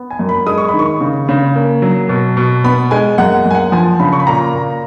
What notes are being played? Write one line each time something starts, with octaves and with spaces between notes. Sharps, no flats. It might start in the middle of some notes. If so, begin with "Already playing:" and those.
Already playing: B3
G#5
F#2
B5
G#3 D#6
C#6
B5
D#3
C#6
C#3
C#3
A#3
F#3
B2
B2
B3 B5
G#3 G#5
F#2 F#5
F#2
G#5
F#5
F3 G#5
C#3 B5
C#6
B5
A#2 A#5
A#2